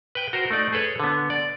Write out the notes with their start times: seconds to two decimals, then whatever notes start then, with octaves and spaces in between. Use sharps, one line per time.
0.15 B4 G5
0.33 F#4 A#4 C5
0.50 A3 D#4 D5
0.72 G#4 A4 B4 C#5
1.00 D3 B3
1.30 D5